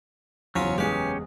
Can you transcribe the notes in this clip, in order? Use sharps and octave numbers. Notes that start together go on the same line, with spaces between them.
F#1 E2 F3 F#3 C#4 F4 C#5
G#3 C#4 G4 G#4 B4 F5